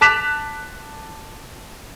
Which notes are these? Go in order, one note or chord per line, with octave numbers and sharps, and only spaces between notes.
A5 D6 F#6 B6 E7 F7